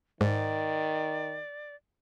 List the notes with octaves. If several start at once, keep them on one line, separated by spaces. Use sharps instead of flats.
G#2 D#3 D5